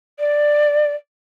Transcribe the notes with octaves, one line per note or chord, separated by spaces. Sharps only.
D5